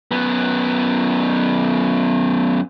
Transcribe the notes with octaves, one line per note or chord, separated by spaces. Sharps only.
F#2 B3